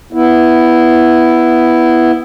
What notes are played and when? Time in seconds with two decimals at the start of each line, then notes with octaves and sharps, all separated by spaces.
0.13 B3 E4